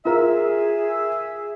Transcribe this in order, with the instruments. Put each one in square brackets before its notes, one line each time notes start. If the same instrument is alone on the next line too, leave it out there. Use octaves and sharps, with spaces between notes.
[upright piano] F4 A#4 [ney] G#4 [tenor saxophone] E5